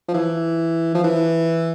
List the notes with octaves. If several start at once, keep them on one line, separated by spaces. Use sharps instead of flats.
F3
E3
F3
E3